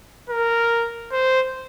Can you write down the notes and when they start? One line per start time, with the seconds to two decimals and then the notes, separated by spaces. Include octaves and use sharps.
0.30 A#4
1.12 C5